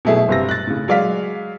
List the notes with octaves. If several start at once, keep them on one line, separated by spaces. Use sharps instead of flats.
B2 F#3 A3 E4 G#4
G1 C3 A#6
F#6 A6
A2 C#3
F#3 G#3 D5 F5 B6